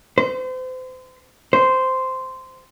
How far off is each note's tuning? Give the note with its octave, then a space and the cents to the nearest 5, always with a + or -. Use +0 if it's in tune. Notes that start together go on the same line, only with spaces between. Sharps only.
C5 -35
C5 -10